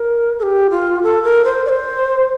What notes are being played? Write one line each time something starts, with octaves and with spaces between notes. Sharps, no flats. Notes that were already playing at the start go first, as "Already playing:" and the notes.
Already playing: A#4
A4
G4
F4
A4
A#4
C5
D5
C5